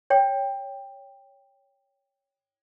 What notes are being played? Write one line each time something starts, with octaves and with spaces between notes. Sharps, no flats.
C#5 G5